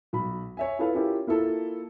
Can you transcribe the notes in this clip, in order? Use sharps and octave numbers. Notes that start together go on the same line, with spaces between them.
B1 B5
C#5 E5 G#5
E4 F4 G#4 A4 B4 F5
C#4 E4 F4 G4 A#4
A#3 E4 F4 A4